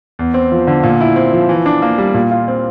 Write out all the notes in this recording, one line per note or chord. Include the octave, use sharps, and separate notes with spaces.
E2
C4
F3
D3
A#2
E4
C4
F3
E3
D4
A#3
G3
A#2
F4
C4